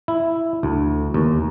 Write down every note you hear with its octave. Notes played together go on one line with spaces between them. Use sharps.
E4
D2
D#2